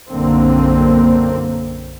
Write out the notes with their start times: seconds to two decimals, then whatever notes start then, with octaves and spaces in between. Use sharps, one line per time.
0.11 B1 F#2 D3 A#3 C4